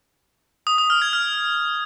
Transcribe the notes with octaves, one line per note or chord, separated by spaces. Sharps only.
D#6
D#6
F6
G#6
F6